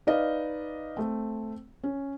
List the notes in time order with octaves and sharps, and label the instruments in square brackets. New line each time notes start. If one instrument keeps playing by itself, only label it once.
[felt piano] D#4 B4 D5 D#5 F5
A3 C4
C#4